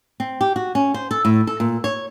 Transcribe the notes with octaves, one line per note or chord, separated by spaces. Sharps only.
C4
G4
F#4
C#4
C5
A4
A2
A4
A#2
C#5